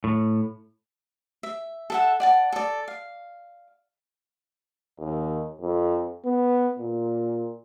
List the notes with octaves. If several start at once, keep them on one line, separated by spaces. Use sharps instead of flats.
A2
E5
A4 E5 F#5
D5 F#5 A5
A4 D5
F5
D#2
F2
B3
A#2